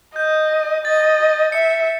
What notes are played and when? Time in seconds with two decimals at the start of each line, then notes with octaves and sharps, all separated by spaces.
0.16 D#5 G6
0.84 D#5 A6
1.52 E5 C#7